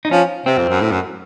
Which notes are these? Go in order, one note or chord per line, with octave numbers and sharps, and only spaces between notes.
D#4
F3 C#4
C3 C4
F2
F#2
A2
F#2